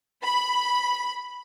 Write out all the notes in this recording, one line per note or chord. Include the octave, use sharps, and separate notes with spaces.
B5